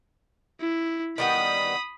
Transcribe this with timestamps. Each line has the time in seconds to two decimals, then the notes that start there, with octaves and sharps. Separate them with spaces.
0.60 E4
1.18 D#3 G3 B3 B5 D#6